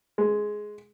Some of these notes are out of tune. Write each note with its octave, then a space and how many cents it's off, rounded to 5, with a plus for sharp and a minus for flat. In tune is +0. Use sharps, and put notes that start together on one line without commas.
G#3 +5